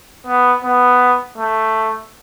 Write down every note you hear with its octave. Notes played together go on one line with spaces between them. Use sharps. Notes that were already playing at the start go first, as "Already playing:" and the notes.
B3
B3
A3